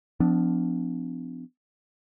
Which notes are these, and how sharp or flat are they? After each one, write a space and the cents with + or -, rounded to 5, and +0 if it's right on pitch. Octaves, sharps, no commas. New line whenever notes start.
F3 +0 B3 +45 D4 +0